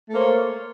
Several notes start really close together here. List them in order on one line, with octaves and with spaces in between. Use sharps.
A3 A#3 C5 C#5